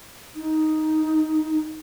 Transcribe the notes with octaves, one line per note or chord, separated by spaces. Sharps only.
D#4